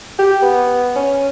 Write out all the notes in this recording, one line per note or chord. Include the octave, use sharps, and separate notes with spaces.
G4
B3
C#4